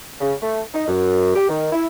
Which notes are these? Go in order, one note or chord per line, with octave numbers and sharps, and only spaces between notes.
C#3
A3
D#4
F#2
G4
D#3
E4